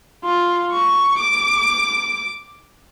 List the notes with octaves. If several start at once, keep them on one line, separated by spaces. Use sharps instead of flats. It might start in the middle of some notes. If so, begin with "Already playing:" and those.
F4
C#6
D6